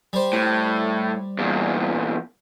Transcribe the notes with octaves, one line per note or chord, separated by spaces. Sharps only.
G3 C5
A2
E2 A#2